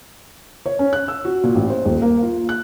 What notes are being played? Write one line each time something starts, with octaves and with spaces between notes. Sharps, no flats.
C#5
C#4
F#6
E6
F#4
A#2
A1
C5
D#1
A#3
F4
F#6